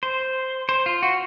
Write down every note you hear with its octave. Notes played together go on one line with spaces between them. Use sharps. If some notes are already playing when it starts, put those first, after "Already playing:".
C5
C5
F4
F#4